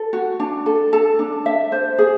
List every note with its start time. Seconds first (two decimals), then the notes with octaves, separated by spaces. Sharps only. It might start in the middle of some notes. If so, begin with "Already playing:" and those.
Already playing: A4
0.13 F#4
0.40 D4
0.66 A4
0.93 A4
1.19 D4
1.46 E5
1.72 C5
1.98 G#4